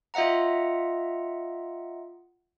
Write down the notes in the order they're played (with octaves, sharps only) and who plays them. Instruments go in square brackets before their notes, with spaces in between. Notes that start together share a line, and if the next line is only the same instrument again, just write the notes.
[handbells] F4 D#5 E5 F#5 A#5